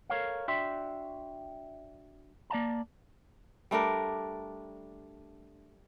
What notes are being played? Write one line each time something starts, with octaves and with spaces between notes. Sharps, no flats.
A4 A#4 C#5 F5
D4 F#4 D5 E5 G5 C6
A#3 D5 F5 A5 A#5
G3 A3 D4 A#4